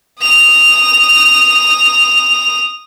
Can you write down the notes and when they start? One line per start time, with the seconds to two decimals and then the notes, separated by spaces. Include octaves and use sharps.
0.21 D#6 F7